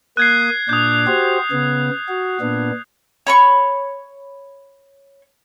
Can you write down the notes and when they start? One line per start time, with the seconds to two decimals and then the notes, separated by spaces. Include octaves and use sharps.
0.17 A#3 D#6 F#6 G#6 C7
0.69 A#2 D4 D5 D#6 G6
1.07 F#4 G4 C5
1.52 C#3 B3
2.09 F#4
2.41 A#2 B3 D4
3.27 C#5 B5 C#6